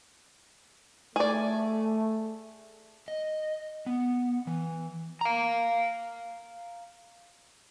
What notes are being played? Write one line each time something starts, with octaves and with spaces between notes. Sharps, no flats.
A3 G#4 D5
D#5
B3
E3
F5 A#5